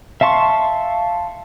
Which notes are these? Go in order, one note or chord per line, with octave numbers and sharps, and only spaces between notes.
E5 F5 A5 C6 C#6